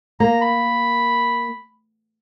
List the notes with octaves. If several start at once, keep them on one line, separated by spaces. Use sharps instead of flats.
A#3 A#5
B5